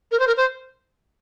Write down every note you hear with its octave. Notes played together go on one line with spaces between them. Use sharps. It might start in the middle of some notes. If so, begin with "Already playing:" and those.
A#4
C5
A#4
C5